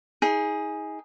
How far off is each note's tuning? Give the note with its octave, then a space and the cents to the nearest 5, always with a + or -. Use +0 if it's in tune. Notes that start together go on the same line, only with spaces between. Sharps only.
D#4 +40 G#4 +0